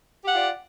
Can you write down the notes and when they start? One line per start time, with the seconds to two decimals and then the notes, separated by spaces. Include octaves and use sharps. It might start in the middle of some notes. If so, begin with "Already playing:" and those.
0.24 G4
0.28 F#5
0.32 F4
0.36 D5